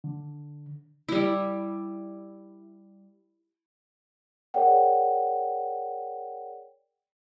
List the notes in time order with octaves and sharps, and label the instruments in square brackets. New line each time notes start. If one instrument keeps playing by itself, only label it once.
[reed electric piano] D3
[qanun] G3 E4
[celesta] G#4 A#4 C#5 D5 F#5 G5